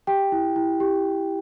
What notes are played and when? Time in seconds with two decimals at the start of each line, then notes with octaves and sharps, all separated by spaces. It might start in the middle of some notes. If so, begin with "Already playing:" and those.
0.07 G4 G5
0.32 E4
0.56 E4
0.80 G4